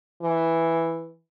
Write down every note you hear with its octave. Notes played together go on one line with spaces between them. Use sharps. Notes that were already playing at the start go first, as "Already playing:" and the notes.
E3